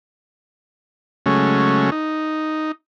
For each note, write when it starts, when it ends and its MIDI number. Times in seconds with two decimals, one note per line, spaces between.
1.26 1.90 49
1.26 1.90 54
1.26 1.90 56
1.26 1.90 57
1.26 1.90 61
1.92 2.72 63